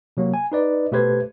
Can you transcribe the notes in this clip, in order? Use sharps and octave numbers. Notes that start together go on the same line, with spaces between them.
C3 F#3 A#3
G#5
D#4 B4 D5 D#5
B2 A3 G4 B4 C5 G#6